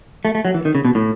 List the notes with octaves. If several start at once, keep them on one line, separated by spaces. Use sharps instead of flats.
A3
A3
F#3
E3
D#3
C#3
B2
A2